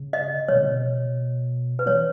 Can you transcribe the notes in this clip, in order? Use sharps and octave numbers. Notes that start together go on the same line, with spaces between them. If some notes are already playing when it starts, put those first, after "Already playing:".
Already playing: C#3
D#5
B2 C#5
C#3
B2
B4
E3 C#5